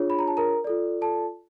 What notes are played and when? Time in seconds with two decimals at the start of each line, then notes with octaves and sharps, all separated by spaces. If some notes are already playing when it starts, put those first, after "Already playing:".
Already playing: D4 F4 G#4 C#5
0.10 B5
0.19 A#5
0.28 A5
0.37 A#4 A#5
0.64 F4 A4 D5
1.01 A4 A5